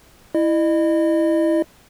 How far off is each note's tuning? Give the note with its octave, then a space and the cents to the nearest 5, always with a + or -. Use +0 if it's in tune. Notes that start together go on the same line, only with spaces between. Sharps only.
E4 +0 D#5 -35